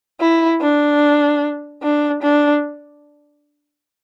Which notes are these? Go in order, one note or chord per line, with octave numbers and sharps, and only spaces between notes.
E4
D4
D4
D4